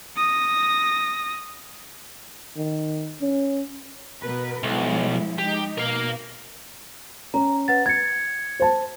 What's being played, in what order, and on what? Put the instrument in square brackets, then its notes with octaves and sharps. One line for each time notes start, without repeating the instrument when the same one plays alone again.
[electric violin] D#6 A#6
[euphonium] D#3
C#4
[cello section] B2 A#4 B4
[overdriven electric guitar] B1 [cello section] F3 G#3 E4
[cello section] G#3 D#4 [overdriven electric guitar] G4
[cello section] B2 [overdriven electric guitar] A#4 F5
[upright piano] C#4 [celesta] A#5
[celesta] B4 F#5 A6
[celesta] G#6 C#7 [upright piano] A6
[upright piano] C5 A5